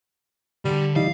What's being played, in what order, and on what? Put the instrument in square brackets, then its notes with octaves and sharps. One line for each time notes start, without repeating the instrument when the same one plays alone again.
[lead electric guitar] D3 [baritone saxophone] G3
[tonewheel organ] E3 D#4 [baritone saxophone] G3 [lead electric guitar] F5